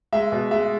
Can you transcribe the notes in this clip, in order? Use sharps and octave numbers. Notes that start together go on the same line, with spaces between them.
G#3 E5
B2
G#3 E5